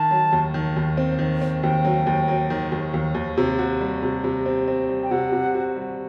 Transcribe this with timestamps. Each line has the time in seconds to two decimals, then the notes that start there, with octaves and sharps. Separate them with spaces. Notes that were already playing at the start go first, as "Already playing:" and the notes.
Already playing: D#3 A5
0.11 F#3
0.32 D#2
0.54 D#3
0.76 D#2
0.97 C4
1.19 D#3
1.42 C4
1.62 D#2 G5
1.85 F#3
2.07 D#2
2.28 F#3
2.50 D#3
2.72 D#2
2.94 D#2
3.14 D#2
3.37 C3
3.58 F#4
3.81 G3
4.02 C3
4.24 C3
4.46 C4
4.68 C4
4.89 G3
5.03 G5
5.11 C3 F#5
5.32 C3
5.55 F#4
5.76 G3